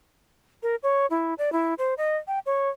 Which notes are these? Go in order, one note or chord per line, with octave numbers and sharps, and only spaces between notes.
A#4
C#5
E4
D5
E4
C5
D#5
G5
C#5